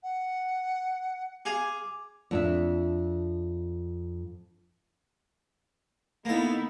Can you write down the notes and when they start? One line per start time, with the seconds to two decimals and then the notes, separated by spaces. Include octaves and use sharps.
0.03 F#5
1.45 G#4 F5 G#5 D6
2.31 F2 D4 E5
6.25 A#3 B3 D#4 E4 A4